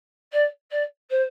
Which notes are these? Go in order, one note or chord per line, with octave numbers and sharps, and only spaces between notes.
D5
D5
C5